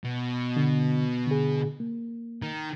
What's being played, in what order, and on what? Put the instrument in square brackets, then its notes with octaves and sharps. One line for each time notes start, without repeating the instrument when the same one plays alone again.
[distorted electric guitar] B2
[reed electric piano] D3
D3 G#4
A#3
[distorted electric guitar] D#3